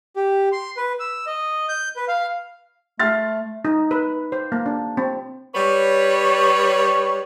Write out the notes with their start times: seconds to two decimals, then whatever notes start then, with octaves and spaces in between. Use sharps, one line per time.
0.16 G4
0.52 C6
0.77 B4
1.00 E6
1.27 D#5
1.69 G6
1.96 B4
2.08 F5
2.99 A3 C6 F6 A6
3.65 D#4
3.91 B4
4.32 C5
4.52 A#3
4.66 D4
4.97 C4
5.55 G3 B4 C#5